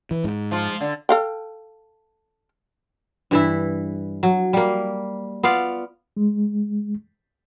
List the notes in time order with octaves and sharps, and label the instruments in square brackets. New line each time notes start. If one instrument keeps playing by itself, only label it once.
[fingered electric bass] E3
G#2
[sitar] F3 F4
D3
[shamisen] A4 F5 G5
[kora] G2 E3 E4
F#3
G3 A#3
B3 F4 D5 F5
[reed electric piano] G#3